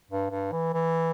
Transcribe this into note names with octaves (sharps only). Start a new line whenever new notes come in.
G2
G2
E3
E3